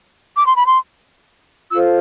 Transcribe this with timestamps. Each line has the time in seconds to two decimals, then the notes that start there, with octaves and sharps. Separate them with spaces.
0.37 D6
0.47 C6
0.57 B5
0.66 C6
1.71 F4 A4 C5 E6